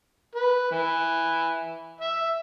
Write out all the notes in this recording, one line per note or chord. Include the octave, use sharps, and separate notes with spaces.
B4
E3
E5